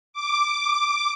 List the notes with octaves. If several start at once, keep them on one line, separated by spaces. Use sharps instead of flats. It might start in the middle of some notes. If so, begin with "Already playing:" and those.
D6